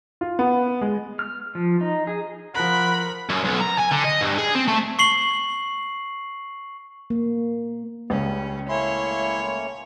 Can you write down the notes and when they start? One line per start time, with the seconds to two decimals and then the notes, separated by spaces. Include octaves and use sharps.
0.21 F4
0.39 B3
0.81 G#3
1.19 F6
1.55 F3
1.81 D#4
2.07 G#4
2.55 F3 A#4 F#5 B5 F#6
3.29 F#2
3.45 B1
3.62 A#5
3.79 G#5
3.92 D3
4.05 D#5
4.21 G2
4.38 G#4
4.55 C4
4.68 A3
4.99 C#6 C7 F#7
7.10 A#3
8.10 C#2 G3 C#4
8.69 A3 A#3 C#4 E4 C#5 C6